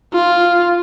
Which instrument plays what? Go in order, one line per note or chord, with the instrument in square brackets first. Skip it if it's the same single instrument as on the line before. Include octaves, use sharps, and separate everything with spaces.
[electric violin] F4